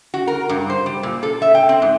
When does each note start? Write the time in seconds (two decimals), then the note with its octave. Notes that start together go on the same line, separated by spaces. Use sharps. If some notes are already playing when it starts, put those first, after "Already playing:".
0.14 F#4
0.27 A#4
0.49 G2
0.70 C5
0.86 G3
1.03 A#2
1.23 A4
1.42 E5
1.55 G5
1.69 C4
1.82 G#2